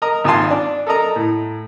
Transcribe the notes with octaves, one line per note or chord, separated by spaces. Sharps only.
A#4 D#5 A#5
G#1 D#4 F4 G#5 A5 C6
D4
A4 A#4 D#5 A#5
A2